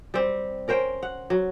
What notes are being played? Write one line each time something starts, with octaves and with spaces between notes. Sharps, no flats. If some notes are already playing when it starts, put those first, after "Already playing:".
G3 C4
C#4 A#4 C5 G5
F#5
F#3